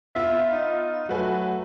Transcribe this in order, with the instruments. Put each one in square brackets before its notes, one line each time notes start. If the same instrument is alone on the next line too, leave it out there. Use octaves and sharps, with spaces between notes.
[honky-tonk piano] B3 F4 [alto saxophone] E5
[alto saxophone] D#4
[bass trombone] F#3 [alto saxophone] A3 [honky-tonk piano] F#4 B4 G#5